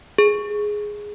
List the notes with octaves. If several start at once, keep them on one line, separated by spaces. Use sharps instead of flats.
G#4